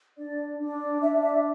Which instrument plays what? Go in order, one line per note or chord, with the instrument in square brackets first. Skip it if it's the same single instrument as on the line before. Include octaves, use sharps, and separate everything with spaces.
[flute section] D4 D5
D4
D4 E5
E5